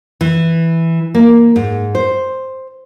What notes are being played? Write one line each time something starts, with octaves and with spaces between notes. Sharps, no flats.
E3
A#3
G#2
C5